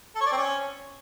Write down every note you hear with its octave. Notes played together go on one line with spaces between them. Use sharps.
A4
C#5
D5
C4
C#4